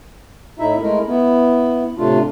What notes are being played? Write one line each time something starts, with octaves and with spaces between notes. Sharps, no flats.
A2 D#4 E4 E5
G#3 A3 E4 A#4
B3 E4
A2 C3 A3 D4 F4